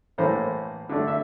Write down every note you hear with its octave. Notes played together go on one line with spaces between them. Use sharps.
A2 E3 A#3 C5
D3 A3 D4
E5